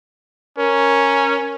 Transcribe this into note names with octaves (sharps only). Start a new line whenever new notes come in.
C#4 A#4